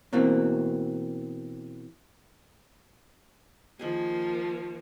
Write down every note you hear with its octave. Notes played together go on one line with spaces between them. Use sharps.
B2 E3 A#3 C4
D#3 F3 A#3 G#4 G#5